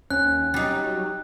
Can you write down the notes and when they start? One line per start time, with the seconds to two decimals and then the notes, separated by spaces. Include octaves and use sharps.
0.10 D#2 C#4 F#6
0.54 F#3 G3 D#4